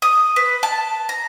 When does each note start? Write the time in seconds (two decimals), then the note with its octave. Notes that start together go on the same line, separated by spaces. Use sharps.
0.02 D#6
0.36 B4
0.63 A5
1.09 A#5